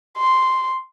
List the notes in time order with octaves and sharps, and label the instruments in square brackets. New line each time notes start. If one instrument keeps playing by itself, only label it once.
[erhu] C6